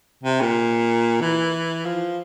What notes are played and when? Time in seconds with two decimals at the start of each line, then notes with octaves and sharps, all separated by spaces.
0.23 C3
0.41 A#2
1.21 E3
1.85 F3